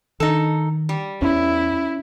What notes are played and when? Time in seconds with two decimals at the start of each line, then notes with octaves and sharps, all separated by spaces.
0.20 D#3 D#4 A4
0.89 G3
1.22 E2 C#4 E4